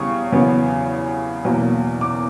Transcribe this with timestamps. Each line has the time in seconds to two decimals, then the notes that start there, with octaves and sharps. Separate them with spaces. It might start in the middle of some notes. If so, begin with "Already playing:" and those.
Already playing: E2 C#3 G3 C#6
0.32 E2 C#3 F#3 B3
1.45 E2 B2 F#3 A#3
2.01 D6